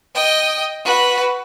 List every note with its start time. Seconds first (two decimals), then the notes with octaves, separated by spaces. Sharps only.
0.15 D#5 G5
0.85 F#4 B4